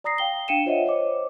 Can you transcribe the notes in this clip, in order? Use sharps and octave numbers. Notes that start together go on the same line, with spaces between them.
D5 A#5 D#6 A#6 C7
F5 G5 G7
D4 F5 G5 C#7 D#7 E7
F4 C5 C#5 D#5 E5 F#5
C5 C#5 D#5 D6